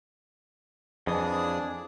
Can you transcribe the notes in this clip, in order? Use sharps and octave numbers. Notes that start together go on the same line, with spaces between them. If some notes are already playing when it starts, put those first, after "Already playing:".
F2 E3 D4 G#4 D#6